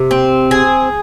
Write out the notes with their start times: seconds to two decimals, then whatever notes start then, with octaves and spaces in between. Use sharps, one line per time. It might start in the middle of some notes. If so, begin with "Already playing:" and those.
Already playing: C3
0.11 C4
0.51 G#4